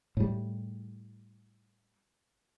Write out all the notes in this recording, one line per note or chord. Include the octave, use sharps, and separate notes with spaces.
A2 G3